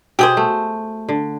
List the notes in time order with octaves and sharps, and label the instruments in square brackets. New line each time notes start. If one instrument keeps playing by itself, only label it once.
[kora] B2 [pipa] G4 G#4 C5
[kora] A3
D3